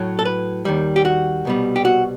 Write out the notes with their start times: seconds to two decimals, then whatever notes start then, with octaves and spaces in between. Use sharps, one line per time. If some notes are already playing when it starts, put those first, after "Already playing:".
Already playing: A2 F#3
0.19 A4
0.25 B4
0.65 D#2 D#3 G3
0.96 G4
1.05 F#4
1.45 C2 B2 G3
1.76 G4
1.85 F#4